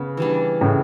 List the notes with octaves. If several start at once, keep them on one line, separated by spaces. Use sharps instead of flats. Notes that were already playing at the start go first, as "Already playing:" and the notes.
Already playing: C#3 B3
E3 G3 D4
A2 C#3